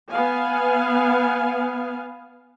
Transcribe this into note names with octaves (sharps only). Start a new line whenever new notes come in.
B3 F5 G#5